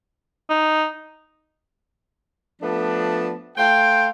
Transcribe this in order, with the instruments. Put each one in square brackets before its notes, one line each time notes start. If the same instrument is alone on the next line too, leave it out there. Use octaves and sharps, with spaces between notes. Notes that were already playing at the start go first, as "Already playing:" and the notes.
[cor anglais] D#4
[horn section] F3 A3 B3 D4
A3 C5 F5 G5